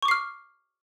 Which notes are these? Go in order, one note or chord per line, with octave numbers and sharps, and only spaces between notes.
C#6 D6 F6 C7